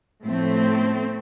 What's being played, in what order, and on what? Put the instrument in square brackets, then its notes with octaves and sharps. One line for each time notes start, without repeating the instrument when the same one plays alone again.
[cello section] A2 F3 A3 C4